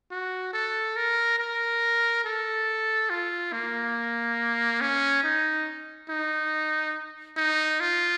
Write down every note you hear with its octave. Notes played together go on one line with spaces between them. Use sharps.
F#4
A4
A#4
A#4
A4
F4
A#3
C#4
D#4
D#4
D#4
F4